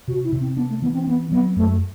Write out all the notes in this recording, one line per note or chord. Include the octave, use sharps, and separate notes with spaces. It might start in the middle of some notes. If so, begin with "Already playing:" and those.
C3 F#4
E4
C3
C4
B3 D4
A3
E3 B3
C4
B3 C4
F#3 B3
F#2 A3